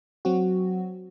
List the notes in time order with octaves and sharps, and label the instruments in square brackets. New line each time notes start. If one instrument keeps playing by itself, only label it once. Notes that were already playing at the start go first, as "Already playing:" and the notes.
[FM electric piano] F#3 C4 F#4